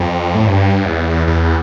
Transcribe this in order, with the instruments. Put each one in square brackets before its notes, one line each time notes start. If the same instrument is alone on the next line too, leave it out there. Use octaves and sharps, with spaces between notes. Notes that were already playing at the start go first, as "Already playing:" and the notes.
Already playing: [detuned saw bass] F2
A2
G2
E2
E2